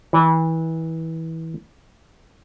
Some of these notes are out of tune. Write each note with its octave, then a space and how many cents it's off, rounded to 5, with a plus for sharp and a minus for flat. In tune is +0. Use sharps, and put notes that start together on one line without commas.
E3 -25